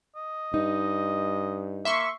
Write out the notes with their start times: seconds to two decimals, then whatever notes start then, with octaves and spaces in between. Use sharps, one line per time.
0.16 D#5
0.54 G2 D#4
1.85 A#3 E5 C6 C#6